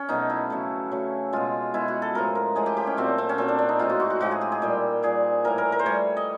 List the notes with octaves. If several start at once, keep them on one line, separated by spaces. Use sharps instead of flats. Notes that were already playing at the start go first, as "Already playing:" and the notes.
Already playing: C#4
B2 F#3 A3 D#4
E4
C#3 F#3 A3
C#3 F#3 A3
B2 G#3 F4
B2 G#3 E4
F#4
A4
A2 F3 G#3 A#4
A#4
A2 F3 G#3 G#4
G4
G4
C#4
A#2 F#3 A3 C4
C4
C#4
A#2 F#3 A3 C4
D4
D4
D#4
A2 F3 G#3 F4
F#4
F#4
F#4
A2 F3 G#3 F#4
G#4
G4
G#4
A#2 G3 G4
A#2 G3 G#4
A2 E3 G3 A#4
A#4
A#4
C5
A2 E3 G3 C#5
D#5